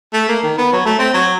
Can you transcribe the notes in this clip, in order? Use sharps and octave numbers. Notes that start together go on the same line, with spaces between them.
A3
A#3
D#3
B3
F#3
A3
C4
F#3